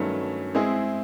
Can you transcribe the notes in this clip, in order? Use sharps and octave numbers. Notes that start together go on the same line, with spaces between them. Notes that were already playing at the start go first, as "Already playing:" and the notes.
Already playing: G2 D#3 F#3 A3 C#4
G#3 C4 E4 G#4